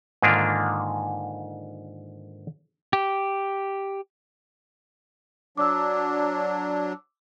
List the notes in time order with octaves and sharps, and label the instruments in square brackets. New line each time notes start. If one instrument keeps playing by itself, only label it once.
[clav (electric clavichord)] G#2 D3 D#3 A#3 D4 F4
[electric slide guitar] G4
[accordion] F#3 D4 [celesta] D6 E6